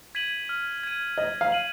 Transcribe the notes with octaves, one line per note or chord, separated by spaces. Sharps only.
G#6 B6 D#7 F#7
F6
G#6 D#7
D#5 G#6
F5
D#7 F#7